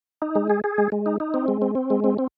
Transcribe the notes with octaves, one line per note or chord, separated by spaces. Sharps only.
D#4
G#3
G#4
G#4
G#3
G#3
D#4
D#4
C4
G#3
C4
C4
G#3
C4
C4